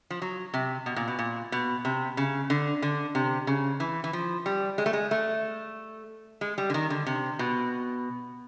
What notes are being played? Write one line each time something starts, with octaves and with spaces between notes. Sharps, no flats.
F3
F#3
C3
B2
A#2
B2
A#2
B2
C3
C#3
D3
D3
C3
C#3
E3
E3
F3
G3
G#3
A3
G#3
A3
G#3
G3
D3
D#3
D3
C3
B2